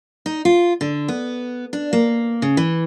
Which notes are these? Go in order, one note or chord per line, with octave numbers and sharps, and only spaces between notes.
D#4
F4
D3
B3
D4
A#3
C#3
E3